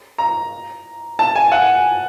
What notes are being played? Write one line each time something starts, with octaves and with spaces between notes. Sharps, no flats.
A#5
A5
G#5
F#5